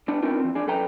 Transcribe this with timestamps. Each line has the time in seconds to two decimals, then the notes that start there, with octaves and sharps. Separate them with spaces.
0.08 G3 B3 D4
0.22 B3 C4 D4 D#4 F4 A#4
0.40 E3 C4
0.55 D4 G#4
0.67 F#2 A4 B4 G5 A#5